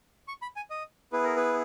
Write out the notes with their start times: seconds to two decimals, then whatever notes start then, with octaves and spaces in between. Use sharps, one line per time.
0.28 C#6
0.42 B5
0.56 G#5
0.70 D#5
1.13 B3 E4 G#4 B4
1.24 A#4
1.37 B4